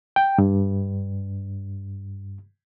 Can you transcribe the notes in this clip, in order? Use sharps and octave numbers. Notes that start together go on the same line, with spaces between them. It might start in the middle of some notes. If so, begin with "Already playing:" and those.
G5
G2